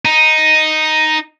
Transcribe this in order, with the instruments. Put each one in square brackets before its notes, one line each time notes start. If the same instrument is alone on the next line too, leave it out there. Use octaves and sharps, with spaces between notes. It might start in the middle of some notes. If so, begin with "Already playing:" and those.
[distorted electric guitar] D#4